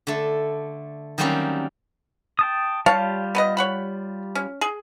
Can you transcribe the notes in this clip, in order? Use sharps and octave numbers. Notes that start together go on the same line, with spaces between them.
D3 A3
D#3 F#3 G3 A#3 C4 C#4
G5 A5 D#6
G3 F4 G4 C#5 F5 A5
B3 B4 D#5
C#5 F#5 B5
C#4
G#4